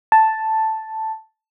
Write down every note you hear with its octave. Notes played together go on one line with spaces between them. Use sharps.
A5